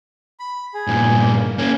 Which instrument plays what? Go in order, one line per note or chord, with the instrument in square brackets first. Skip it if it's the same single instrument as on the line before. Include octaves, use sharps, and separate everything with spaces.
[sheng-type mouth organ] B5
G#4
[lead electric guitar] G2 A#2
[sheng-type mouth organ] A#3
[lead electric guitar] A#3 C#4 [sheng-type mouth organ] G#5